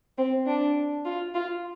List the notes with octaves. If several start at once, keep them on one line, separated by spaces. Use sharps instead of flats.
C4
D4
F4
F4